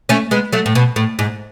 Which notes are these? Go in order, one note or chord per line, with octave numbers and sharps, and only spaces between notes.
A3 C#4
G#3 B3
F#3 A3
A2
B2
A2
G#2